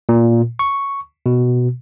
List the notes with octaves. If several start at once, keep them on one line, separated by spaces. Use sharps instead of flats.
A#2
C#6
B2